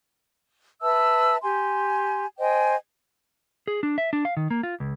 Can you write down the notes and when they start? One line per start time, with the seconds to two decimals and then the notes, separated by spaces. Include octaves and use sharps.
0.82 B4 E5 A5 E6
1.43 G4 G#5 C6
2.39 C5 D#5 G5 G#5
3.68 G#4
3.83 D4
3.98 E5
4.13 D4
4.25 F5
4.37 D#3
4.51 A#3
4.63 F4
4.80 C#2